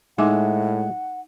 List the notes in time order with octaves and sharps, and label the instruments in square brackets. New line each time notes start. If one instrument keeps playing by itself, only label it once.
[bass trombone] A2 [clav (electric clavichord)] G#3 E5 [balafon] D#4 G#5 D6 [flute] F#5